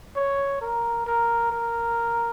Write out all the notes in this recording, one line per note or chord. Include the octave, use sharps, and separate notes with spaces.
C#5
A#4
A#4
A#4